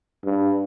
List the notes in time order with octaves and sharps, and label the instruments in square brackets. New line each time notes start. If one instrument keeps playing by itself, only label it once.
[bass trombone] G2